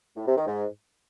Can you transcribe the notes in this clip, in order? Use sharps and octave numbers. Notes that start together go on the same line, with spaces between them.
A2
C3
D#3
G#2